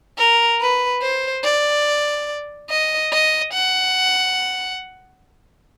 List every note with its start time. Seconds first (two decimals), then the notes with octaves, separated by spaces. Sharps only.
0.18 A#4
0.60 B4
1.02 C5
1.44 D5
2.70 D#5
3.12 D#5
3.53 F#5